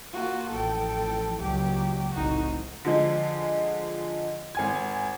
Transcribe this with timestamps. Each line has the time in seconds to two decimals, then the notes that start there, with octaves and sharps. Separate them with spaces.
0.13 A#3 F4 F#4
0.50 A1 F3 A4 G5
1.39 C#2 A#2 F#3 G4
2.11 F1 C2 A2 D#4 F#4
2.85 D3 F3 G#3
4.55 G#1 G#5 G#6